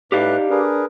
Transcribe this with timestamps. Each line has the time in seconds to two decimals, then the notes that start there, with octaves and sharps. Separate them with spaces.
0.12 A2 D#4 G4 B4 D5 F5 F#6
0.50 D4 G#4 A#4 B4